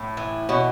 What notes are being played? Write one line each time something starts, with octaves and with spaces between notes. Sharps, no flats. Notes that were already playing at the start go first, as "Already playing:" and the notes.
Already playing: A2
E3
B2 C#4